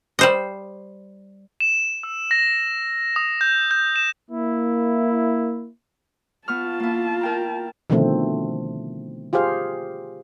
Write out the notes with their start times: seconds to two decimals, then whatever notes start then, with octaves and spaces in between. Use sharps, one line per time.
0.19 G3 C5 D#5
1.60 E7
2.03 E6
2.31 A#6
3.16 D#6
3.41 G6
3.71 G6
3.96 E7
4.31 A#3 E4
6.48 B3 F4 A5 C#6 F6
6.80 A#3 E4
7.21 A#4 G5 A#5
7.90 B2 D3 D#3 F3 A3 C4
9.33 F4 G4 G#4 C5 F5